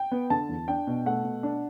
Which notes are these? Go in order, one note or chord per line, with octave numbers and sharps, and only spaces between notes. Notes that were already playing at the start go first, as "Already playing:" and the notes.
Already playing: G5
B3
D3 A5
E2
D4 G5
B2
A3 F#5
B2
D4